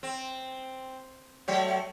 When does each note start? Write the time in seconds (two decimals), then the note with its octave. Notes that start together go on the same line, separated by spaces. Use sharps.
0.03 C4
1.48 F#3 A3 C#5